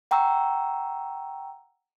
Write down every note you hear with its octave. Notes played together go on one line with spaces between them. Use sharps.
F#5 G5 A#5 C#6 E6